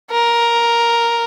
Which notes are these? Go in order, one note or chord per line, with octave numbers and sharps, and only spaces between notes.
A#4